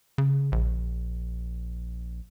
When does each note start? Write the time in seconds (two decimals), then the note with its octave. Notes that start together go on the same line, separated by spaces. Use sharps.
0.18 C#3
0.52 A#1